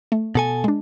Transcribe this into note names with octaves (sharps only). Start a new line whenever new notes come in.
A3
B2 A4 G#5
G#3 D4